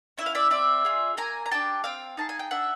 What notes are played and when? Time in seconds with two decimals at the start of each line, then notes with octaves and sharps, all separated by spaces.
0.18 C#4 E4 E5
0.26 F5
0.35 D5 E5
0.51 C4 D5 E5
0.85 F4 G#4
1.17 A#3 G#5 A#5
1.46 A#5
1.51 D4 G4 G5 A5
1.84 C4 F5 G5
2.17 D#4 G#4 A5
2.29 G#5
2.39 G5
2.51 D4 E5 F#5